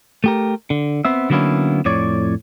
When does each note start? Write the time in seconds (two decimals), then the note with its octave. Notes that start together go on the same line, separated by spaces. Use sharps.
0.24 A3 G4 A#4
0.70 D3
1.05 B3 C4 E5
1.30 D3 F#3 A#3 B3 C#4 E4
1.85 F2 A2 C#5 D5